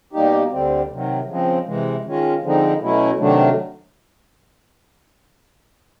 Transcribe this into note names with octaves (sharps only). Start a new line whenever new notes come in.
B2 G3 A#3 D#4 G4
D2 D3 G3 C4
C3 D#3 F#3
C#3 F3 G#3 C4
C3 E3 G#3
D#3 G#3 C#4 F4
D3 F3 G#3 C4 D#4
B2 F#3 A3 C#4 E4
C3 D#3 F#3 A3 D4